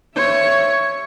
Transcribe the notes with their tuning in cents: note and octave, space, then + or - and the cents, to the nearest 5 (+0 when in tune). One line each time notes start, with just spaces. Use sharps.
C#5 +0 E5 +20